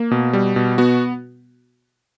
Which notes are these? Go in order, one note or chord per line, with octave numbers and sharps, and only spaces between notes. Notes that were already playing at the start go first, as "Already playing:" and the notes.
Already playing: A#3
B2
G3
B2
B3 F#4